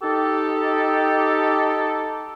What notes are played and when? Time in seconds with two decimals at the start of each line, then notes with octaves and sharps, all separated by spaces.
0.02 D#4 G4 A4